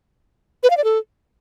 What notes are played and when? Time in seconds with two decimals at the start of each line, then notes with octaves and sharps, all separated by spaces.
0.63 B4
0.70 F5
0.77 D5
0.84 A4